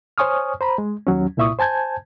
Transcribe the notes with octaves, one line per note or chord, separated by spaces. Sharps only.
C5 C#5 G#5 C#6 D#6 F6
C5 A#5 B5
G#3
D#2 F#3 C#4
C2 A#2 E4 E5 C#6 D#6
C5 G#5 A5 G6 G#6